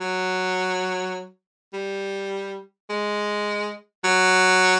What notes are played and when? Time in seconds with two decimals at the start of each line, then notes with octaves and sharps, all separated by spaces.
0.01 F#3
1.73 G3
2.90 G#3
4.04 F#3